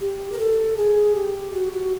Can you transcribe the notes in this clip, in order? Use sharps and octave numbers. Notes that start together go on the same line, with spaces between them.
G4
A#4
A4
G#4
G4
F#4
F#4